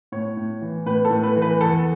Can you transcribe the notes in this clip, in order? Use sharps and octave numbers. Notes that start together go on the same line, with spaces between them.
A2 C#5
A2
E3
A2 B4
A4
A2
B4
E3
B4
E2 A4